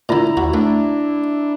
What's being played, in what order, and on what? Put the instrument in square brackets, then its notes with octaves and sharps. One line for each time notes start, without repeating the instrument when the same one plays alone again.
[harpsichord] A#2 D3 [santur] E4 A#5
[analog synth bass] D#2 [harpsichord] F#4
[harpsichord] A3 [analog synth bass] D4